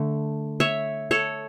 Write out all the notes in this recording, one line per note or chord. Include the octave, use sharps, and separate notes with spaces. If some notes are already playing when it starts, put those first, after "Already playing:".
Already playing: D3 A3
C#5 E5
A4 C#5